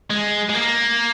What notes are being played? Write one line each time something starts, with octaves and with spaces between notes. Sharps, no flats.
G#3
G#3
A#3